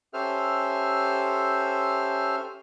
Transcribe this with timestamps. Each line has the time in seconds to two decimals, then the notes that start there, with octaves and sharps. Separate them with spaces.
0.14 C#4 G4 A4 C5 E5 F6